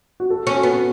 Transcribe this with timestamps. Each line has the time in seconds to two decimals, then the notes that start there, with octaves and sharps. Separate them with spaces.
0.20 F#4
0.30 A4
0.47 C#4
0.55 F#4
0.63 B3